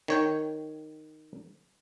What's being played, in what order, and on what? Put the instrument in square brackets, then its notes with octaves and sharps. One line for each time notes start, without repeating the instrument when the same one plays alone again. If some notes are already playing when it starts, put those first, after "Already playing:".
[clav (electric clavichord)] D#3 C#5 G5